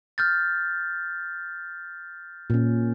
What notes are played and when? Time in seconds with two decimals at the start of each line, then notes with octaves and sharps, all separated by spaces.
0.18 F6 G6 A6
2.50 A#2 C#4